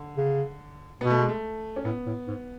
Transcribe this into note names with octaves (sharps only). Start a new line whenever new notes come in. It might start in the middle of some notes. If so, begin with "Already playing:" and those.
Already playing: D3
C#3
B2 B3
A3
G#3
A3
C#4
A2 B3
A2
G#2